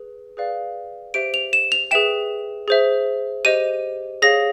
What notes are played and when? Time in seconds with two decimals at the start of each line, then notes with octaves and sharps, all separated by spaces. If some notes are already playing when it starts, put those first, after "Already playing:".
Already playing: G#4 B4
0.37 G#4 B4 D5 F5
1.14 G4 C5 E5 D7
1.34 F7
1.53 E7
1.72 F7
1.91 G#4 B4 E5 G5 E7
2.68 G#4 C5 E5
3.45 G4 C5 D#5 D#7
4.22 G#4 C#5 F5 A#6